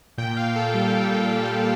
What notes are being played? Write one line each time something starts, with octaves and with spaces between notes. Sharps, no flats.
A#2 G5
A#2 F5
A#2 A4
G3
G3
A#2
G3
A#2